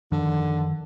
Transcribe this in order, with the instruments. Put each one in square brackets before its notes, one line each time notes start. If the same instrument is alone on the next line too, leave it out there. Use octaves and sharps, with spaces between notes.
[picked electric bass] F#2 D#3 F3 [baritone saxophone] D3